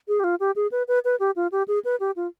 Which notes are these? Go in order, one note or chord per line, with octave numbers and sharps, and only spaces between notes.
G#4
G4
F4
G4
G#4
B4
B4
B4
G4
F4
G4
G#4
B4
G4
F4